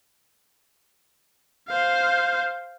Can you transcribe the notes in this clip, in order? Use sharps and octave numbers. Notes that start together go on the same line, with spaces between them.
C5 F5